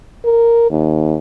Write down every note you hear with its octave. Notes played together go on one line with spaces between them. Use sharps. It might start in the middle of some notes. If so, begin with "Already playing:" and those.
A#4
D#2